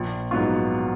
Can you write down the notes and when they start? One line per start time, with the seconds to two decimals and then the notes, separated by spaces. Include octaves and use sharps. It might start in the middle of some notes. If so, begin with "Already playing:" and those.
Already playing: A#1
0.31 G#2 F#3 B3 F4